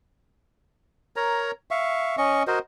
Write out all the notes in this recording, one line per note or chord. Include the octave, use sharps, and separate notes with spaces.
A#4 C#5 A#5
E5 F5 C#6
C#4 D#5 C#6
F#4 A#4 C5 D#5